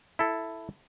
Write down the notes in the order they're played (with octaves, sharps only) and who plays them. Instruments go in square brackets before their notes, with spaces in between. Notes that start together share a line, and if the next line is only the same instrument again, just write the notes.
[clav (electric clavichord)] E4 A4